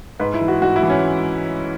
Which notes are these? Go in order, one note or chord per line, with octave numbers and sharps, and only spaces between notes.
G#2 B4
E4
E3
F#4
G#2 F#4
E4
E3
C#4